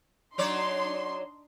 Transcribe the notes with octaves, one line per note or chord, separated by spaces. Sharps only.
F#3 D4 D#4 C#5 D5 C6